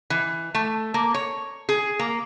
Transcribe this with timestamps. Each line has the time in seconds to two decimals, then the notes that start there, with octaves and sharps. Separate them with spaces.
0.10 E3
0.55 A3
0.94 A#3
1.14 C#5
1.69 G#4
1.99 A#3